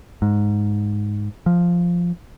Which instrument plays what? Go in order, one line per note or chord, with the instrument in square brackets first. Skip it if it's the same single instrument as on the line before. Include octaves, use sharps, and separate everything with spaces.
[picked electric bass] G#2
F3